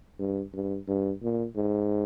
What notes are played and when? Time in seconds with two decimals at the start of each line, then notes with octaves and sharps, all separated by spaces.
0.19 G2
0.54 G2
0.88 G2
1.22 A#2
1.56 G#2